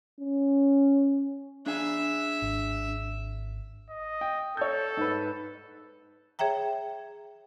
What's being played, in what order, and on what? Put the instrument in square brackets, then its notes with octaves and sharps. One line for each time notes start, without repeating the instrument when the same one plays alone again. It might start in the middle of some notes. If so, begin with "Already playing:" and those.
[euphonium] C#4
[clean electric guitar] D4 G#4 G#5 [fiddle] E5
[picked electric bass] G#1
[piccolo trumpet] D#5
[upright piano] G5
[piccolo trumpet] A4 [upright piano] C#5 G6
[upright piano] G#2 B4
[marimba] G#4 C#5 E5 G5 A#5